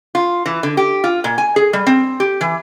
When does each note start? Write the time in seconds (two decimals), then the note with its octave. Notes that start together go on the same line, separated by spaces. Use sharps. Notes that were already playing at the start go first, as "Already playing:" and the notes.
0.15 F4
0.46 E3
0.63 D3
0.77 G4
1.04 F4
1.24 A#2
1.38 G#5
1.56 G#4
1.73 G3
1.86 C4
2.20 G4
2.41 E3